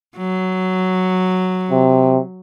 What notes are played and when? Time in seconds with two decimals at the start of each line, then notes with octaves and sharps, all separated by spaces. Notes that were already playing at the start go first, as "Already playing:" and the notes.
0.18 F#3
1.71 C3